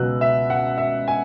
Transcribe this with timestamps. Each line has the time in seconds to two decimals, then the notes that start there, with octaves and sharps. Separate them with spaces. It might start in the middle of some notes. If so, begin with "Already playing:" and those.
Already playing: C#2 B2 F#3 B3 E6 F#6
0.21 E5
0.50 F#5
0.78 E5
1.08 G#5